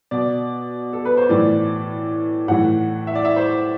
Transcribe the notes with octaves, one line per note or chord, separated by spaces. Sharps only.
B2 D5
A4
B4
C5
A2 E3 D5
A2 E3 F#5
E5
D5
E5
C5